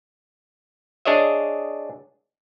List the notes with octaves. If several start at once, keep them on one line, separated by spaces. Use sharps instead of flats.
D4 G#4 C#5 D#5 E5